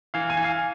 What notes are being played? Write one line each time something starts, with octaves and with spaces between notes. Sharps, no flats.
E3 F5
G#5
E3
F5